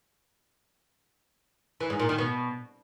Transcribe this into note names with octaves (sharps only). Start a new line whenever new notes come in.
E3
G#2
A#2
D#3
B2